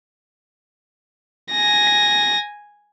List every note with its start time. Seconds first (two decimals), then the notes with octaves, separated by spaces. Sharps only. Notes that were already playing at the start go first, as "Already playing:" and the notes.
1.52 G#5 A#6